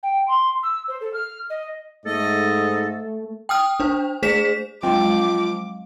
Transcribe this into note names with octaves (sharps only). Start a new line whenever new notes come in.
G5
C6
E6
C5
A4
F6
D#5
G#2 A3 A4 D#5
G5 D#6 F6
D4 C5
A3 G#4 C5 B6 E7
F3 F#3 G#3 G5 D6